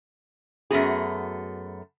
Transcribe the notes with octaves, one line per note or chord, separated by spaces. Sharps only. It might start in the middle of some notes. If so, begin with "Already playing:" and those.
F#2 A3 B3 F#4 G#4